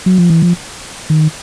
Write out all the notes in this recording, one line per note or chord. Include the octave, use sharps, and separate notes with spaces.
F#3
F3
E3
F3
D#3